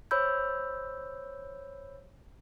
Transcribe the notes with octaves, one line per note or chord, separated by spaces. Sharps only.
C5 C#5 B5 E6 G6